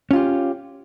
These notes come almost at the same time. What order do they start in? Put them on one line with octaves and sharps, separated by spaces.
C#4 F4 G4